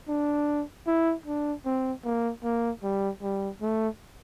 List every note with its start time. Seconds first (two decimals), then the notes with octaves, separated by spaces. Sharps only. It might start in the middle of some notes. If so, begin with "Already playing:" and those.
0.08 D4
0.87 E4
1.26 D4
1.65 C4
2.04 A#3
2.43 A#3
2.83 G3
3.22 G3
3.61 A3